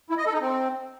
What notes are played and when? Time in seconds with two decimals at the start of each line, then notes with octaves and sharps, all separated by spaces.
0.10 E4
0.18 D#5
0.25 A4
0.33 D#4
0.41 C4